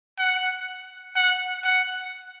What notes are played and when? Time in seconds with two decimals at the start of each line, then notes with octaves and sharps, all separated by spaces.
0.19 F#5
1.16 F#5
1.64 F#5